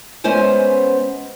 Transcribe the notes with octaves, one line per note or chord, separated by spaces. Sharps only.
G#3 B3 C#4 C5 G#5